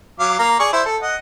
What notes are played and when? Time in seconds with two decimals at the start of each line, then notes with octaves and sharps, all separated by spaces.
0.20 F#3 F5 D6
0.39 A#3 A#5
0.60 G#4 D5 C#6
0.73 E4 C5
0.86 A4
1.02 D#5 F#5